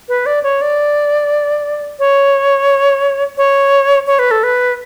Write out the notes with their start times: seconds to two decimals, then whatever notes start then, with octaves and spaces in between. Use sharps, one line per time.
0.09 B4
0.26 D5
0.43 C#5
0.61 D5
1.99 C#5
3.37 C#5
4.07 C#5
4.19 B4
4.31 A4
4.43 B4